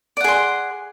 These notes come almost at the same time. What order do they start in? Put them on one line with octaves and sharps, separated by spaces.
D5 F#5 G#4 C6